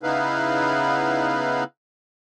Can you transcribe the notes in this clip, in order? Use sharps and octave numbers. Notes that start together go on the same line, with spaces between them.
C#3 B3 D#4 E4 B4 F5